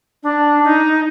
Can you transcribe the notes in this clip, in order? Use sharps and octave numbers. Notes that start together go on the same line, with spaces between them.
D4
D#4